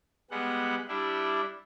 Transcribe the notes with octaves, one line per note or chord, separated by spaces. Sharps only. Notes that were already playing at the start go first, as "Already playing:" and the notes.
G3 G#3 B3 F#5
G3 D4 E4